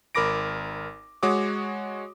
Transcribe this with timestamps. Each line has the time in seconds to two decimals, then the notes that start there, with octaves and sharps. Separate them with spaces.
0.15 G#1 A#4 B5 D6 A#6 D7
1.23 G#3 F#4 C#5 D6 D#6